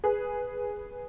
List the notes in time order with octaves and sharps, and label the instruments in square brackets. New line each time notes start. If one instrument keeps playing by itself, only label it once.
[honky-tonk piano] G#4 B4